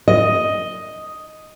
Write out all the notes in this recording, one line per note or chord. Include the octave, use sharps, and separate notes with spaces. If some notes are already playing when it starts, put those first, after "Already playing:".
D#5